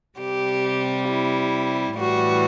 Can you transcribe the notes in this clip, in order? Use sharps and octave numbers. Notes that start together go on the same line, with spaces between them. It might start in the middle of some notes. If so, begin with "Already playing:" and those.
C3 G3 G4
E4
A2 E3 G3 F#4